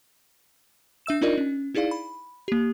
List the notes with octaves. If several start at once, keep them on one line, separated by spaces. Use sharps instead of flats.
D4 E5 E6 E7
D4 D#4 F4 A#4 D5 D#5
C#4
D#4 E4 G#4 D5 F5
B5
A#3 G4